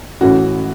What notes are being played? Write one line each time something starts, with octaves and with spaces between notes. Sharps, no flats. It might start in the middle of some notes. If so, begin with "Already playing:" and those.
A1 A2 E3 C#4 F#4